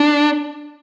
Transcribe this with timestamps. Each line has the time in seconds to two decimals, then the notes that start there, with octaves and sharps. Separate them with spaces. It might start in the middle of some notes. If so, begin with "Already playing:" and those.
Already playing: D4